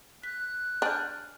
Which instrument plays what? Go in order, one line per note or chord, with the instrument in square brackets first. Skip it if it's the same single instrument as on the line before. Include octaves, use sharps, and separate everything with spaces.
[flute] F#6 [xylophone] B6
[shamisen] D4 [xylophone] G#5 F6 G6